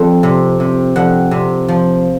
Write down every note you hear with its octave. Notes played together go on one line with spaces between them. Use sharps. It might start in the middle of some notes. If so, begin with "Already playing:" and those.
Already playing: F2
C3
C3
F2 F#5
C3
F3